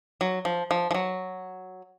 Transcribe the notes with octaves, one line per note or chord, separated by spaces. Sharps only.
F#3
F3
F3
F3
F#3